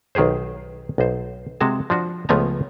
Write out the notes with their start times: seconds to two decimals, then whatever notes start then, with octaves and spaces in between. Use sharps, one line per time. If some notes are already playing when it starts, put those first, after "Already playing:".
0.15 B1 D#3 G4 G#4 C5
0.98 B1 C5
1.61 C3 G#3 F#4 A5
1.90 F3 D4 F#4
2.29 C#2 F3 A3 B3 G#5 A#5